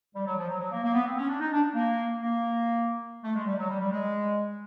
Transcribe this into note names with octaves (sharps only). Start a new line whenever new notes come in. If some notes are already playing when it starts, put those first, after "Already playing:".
G3
F#3
F3
F#3
F#3
A#3
A#3
B3
C4
C#4
D4
D#4
D4
A#3
A#3
A3
G#3
G3
F#3
G3
G3
G#3